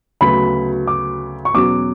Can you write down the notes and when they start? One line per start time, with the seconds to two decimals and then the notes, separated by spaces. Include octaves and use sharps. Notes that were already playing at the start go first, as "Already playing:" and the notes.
0.21 D2 C#3 F#3 B3 F#4 B5
0.87 D6
1.45 C#6
1.54 E2 B2 F#3 C#4 F#4 D6